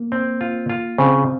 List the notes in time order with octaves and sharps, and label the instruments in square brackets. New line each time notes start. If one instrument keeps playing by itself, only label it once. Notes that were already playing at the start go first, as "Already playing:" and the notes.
Already playing: [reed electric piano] A#3
[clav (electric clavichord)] C4
F4
F4
[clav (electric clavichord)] C#3 [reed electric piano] C4